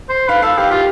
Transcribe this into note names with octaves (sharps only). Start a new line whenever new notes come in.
C5
B4 F5
A4 F5
G4 F5
F4 G4